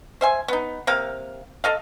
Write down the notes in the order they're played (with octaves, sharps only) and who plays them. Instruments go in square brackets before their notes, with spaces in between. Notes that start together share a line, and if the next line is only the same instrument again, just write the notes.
[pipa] C5 E5 G#5
B3 D#4
C3 A#3 F5
A4 D#5 F5